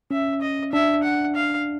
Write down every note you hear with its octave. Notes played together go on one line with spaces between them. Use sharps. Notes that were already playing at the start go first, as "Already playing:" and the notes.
C#4 E5
D#5
D4 E5
F#5
F5